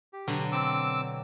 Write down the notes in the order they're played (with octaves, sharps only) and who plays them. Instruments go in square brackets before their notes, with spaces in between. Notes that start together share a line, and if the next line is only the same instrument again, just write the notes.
[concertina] G4
[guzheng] B2 D3 F#3
[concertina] C4 D6 E6